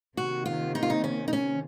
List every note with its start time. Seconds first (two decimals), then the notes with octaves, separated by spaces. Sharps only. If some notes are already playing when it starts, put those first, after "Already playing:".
0.17 C3 D#3 A#3 F#4
0.46 F4
0.75 D#4
0.83 F4
0.90 D#4
1.04 C#4
1.28 D#4
1.33 C#4